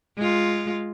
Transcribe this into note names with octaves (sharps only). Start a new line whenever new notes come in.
G#3 F4